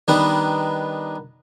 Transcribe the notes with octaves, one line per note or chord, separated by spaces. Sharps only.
D#3 G3 B3 D4